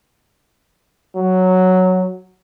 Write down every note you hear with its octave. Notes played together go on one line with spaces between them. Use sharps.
F#3